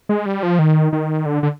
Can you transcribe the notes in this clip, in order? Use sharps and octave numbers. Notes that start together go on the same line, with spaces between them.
G#3
G3
F3
D#3
D#3
D3
D3